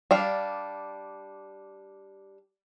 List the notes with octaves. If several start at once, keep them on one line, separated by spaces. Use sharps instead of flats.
G3 D4 F5